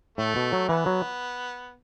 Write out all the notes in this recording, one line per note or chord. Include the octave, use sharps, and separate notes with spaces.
A2 A3
B2
F#3
E3 B3
F#3